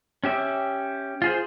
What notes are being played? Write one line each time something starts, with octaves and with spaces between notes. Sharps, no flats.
C#4 G4 E5
F4 G#4 C5